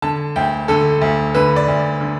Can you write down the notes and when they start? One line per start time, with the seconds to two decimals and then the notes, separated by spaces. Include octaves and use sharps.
0.02 D3 A5
0.36 D2 G5
0.68 D3 A4
1.02 D2
1.34 D3 B4
1.56 D5
1.68 D2
2.01 D3